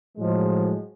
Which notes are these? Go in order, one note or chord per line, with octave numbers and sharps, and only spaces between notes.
A2 F3 F#3 G#3